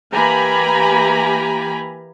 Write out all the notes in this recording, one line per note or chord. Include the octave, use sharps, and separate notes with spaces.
E3 A#3 G4 G#5 A#5 B5